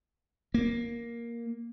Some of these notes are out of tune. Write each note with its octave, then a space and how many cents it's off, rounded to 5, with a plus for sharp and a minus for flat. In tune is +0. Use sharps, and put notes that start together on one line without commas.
A#3 +5